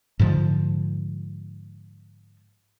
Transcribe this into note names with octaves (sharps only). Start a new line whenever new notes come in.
G#2 D3 F3